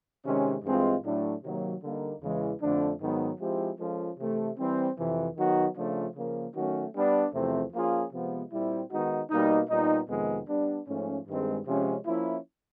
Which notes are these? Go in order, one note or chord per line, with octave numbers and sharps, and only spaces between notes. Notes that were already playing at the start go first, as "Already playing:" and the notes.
C3 D#3 G#3 C#4
G2 E3 G#3 C4 F4
A2 F#3 A3 D4
C3 D#3 F#3 A#3
D3 G3 A#3 D#4
E2 C#3 E3 G#3
F2 D3 F3 A3 D4
G#2 D#3 F#3 B3
F3 G#3 C4 E4 G4
F3 G#3 C#4 F4 A4
C3 E3 A3
E3 G3 C4
F2 C3 E3
D#3 F#3 B3 D#4 F#4
C#3 F3 A3 D4 F4
C#3 F3 A#3
D#3 F#3 A3 C#4 F#4
G3 B3 D4
E2 C3 F3 A3 C4
F3 A#3 C#4 F4 G#4
C3 F3 G#3 B3
A#2 G3 C4 E4
D#3 G#3 B3 D#4 F#4
B2 G3 A#3 D#4
A#2 G3 B3 D#4
F2 C3 D#3 G#3 B3
G3 B3 D4
G#2 F3 A3 C#4
G2 D#3 G#3 C4
C3 F3 G#3 C#4
F3 A#3 C#4 E4